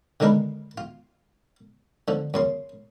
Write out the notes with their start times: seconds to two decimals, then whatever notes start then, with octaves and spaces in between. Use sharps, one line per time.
0.20 D3 D#3 G#3 D4 A#4 B4
0.78 F4
2.08 D3 F3
2.34 F#2 C#3 C6